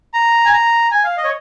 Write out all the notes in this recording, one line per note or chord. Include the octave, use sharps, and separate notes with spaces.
A#5
G#5
A#5
G#5
F5
D#5
C#5